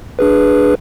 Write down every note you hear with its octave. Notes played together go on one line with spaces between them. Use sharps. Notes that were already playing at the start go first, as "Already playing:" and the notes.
D4 G#4 B4